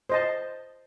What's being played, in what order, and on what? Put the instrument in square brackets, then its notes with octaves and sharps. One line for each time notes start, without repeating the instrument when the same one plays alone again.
[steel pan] C5 D#5 A5